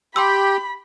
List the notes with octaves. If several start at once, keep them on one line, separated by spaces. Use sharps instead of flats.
G4 G5 B5 C6 E6